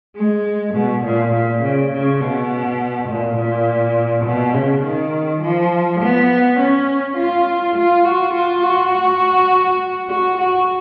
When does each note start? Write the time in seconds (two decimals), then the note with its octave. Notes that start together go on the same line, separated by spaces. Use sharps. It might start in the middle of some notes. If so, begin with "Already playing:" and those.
0.16 G#3
0.75 B2
1.05 A#2
1.33 A#2
1.62 C#3
1.92 C#3
2.21 B2
3.09 A#2
3.37 A#2
4.25 B2
4.54 C#3
4.84 D#3
5.42 F3
6.01 B3
6.59 C#4
7.17 F4
7.76 F4
8.05 F#4
8.34 F4
8.63 F#4
10.09 F#4
10.38 F#4